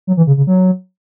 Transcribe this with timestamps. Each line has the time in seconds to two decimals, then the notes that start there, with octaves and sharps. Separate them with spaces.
0.07 F#3
0.17 E3
0.27 C#3
0.37 C#3
0.47 F#3